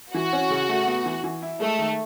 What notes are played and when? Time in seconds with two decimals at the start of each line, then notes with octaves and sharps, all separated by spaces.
0.14 E3 F#4
0.33 C#4
0.50 C#3
0.69 A3
0.87 B3
1.06 E3
1.24 E3
1.42 E4
1.61 G#3 A3
1.79 D#3